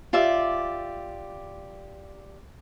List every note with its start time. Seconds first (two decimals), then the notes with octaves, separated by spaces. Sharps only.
0.13 F4 G4 D5 E5